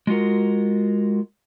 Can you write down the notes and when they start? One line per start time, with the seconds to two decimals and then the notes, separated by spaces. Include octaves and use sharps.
0.07 G#3 F4 F#4 A#4